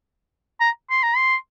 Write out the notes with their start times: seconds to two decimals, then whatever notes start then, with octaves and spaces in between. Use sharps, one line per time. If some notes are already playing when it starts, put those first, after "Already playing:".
0.61 A#5
0.90 C6
1.03 A#5
1.16 C6